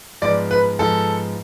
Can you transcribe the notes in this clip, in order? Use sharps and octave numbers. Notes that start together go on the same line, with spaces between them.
G#2 F3 B3 D5
B4
G#2 F3 B3 A4